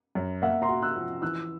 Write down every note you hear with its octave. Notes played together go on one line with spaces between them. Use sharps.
F#2
A#3 E5 F#5
A#5 C6
F#4
E6 F#6
F3
E3 E6 F#6